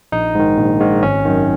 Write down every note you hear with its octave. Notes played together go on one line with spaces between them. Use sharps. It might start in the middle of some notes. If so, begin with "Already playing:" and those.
A#1 D#4
G#2 D#3
A#1
G#2 D#3
G#1 C#4
F#2 D#3